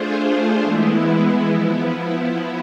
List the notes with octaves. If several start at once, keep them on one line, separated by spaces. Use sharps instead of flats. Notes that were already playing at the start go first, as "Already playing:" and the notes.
Already playing: A3 D4 F4 G#4 C5
E3 G#3 B3 E4
F3 B3 E4